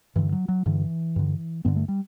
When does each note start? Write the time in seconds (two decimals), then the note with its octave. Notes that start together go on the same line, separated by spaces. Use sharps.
0.16 G2 D3 E3
0.32 F#3
0.48 F#3
0.66 G2 D3 E3
1.16 G2 D3
1.65 G2 D3 B3
1.76 A3
1.88 G3